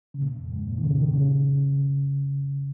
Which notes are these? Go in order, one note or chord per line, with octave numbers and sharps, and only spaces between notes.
C#3
A#2
F2
G#2
A#2
D#3
C#3
D#3
C#3